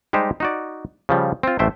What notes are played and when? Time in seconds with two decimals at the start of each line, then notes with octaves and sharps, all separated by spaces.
0.13 G3 G#3 D#4 G4 C5
0.40 D#4 F#4 D5
1.09 C#3 F3 G3
1.43 C4 F4
1.59 A1 A3 C5 E5 G5